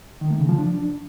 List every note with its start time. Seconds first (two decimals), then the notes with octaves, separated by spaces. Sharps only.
0.21 D#3
0.31 A3
0.40 C#3
0.49 F3
0.58 D4